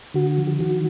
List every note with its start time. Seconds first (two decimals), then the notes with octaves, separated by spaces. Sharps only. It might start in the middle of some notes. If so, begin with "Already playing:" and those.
0.14 D3 F#4
0.38 F3
0.60 D#3 F#4